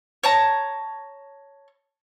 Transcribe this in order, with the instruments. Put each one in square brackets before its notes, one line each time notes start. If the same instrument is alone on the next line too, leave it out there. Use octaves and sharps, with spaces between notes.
[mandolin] C#5 A5 A#5